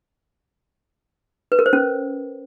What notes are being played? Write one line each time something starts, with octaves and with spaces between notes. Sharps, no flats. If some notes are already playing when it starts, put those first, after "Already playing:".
B4
A#4
C5
C#4